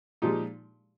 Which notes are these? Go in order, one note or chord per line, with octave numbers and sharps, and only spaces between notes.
A#2 F3 G#3 D#4 G4